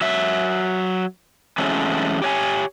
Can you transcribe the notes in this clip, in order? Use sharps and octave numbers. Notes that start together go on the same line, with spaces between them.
F#3 E5
E3 F#3 G#3 A3 C4 C#4
G4 C#5 G#5